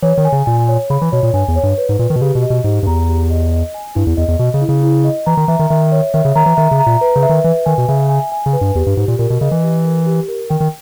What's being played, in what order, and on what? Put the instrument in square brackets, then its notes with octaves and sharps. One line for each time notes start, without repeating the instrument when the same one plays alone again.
[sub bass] E3 [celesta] C#5
[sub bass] D#3
[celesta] G#5
[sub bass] C#3
[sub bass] A#2 [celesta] G#5
[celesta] C#5
[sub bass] C#3 [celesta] B5
[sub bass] E3
[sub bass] B2 [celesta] C#5
[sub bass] A#2
[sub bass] G2 [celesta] G#5
[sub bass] E2
[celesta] C#5
[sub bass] G2
[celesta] B4
[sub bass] G#2
[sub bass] A#2 [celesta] B4
[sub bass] D#3
B2
[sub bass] C#3 [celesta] G4
[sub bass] B2
[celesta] D#5
[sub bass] B2
[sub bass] G#2 [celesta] G4
[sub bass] G2
[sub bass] E2 [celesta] A#5
[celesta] G4
D#5
D#5
G#5
[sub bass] G2 [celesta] E4
[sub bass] E2
[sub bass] E2 [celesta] D#5
[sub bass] E2
[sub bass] B2 [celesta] D#5
[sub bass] C#3
[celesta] E4
[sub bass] C#3
[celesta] E4
D#5
[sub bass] E3 [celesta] A#5
[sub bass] D#3
[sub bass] E3 [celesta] E5
[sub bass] D#3
[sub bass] D#3 [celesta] E5
[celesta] C#5
[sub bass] D#3 [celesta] E5
[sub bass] C#3
[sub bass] D#3 [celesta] A#5
[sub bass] E3
[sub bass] D#3 [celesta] E5
[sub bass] C#3
[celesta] A#5
[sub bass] A#2
[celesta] B4
[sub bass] C#3
[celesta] E5
[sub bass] D#3
[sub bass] E3 [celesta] B4
[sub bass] D#3 [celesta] G#5
[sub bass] B2
[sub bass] C#3 [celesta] E5
[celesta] G#5
G#5
[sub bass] C#3
[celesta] B4
[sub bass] G2
[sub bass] E2 [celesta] G4
[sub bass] G2
[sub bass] G#2 [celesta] G4
[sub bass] A#2
[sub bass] A#2 [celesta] A#4
[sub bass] B2
[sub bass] C#3 [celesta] D#5
[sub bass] E3
[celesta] G4
A#4
G4
A#4
[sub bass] D#3 [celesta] G5
[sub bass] D#3